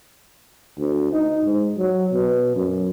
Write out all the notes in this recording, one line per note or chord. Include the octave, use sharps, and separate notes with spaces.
D2
D#4
G#2
F#3
B2
F#2